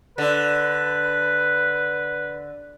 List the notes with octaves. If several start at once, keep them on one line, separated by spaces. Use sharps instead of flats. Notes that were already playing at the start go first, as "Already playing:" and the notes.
D3 B4